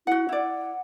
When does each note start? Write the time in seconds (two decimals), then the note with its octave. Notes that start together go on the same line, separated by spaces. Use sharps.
0.07 E4 F#4 F#5
0.29 E4 D5 F#5